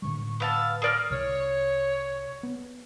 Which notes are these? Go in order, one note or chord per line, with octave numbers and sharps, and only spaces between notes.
A2 D3 G3 C#6
B3 F5 A5 E6
G#4 A#4 D5 F6
C2 C3 C#5
B3